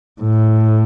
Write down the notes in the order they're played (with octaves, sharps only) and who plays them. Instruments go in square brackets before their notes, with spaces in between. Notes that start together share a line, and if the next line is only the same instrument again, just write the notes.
[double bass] A2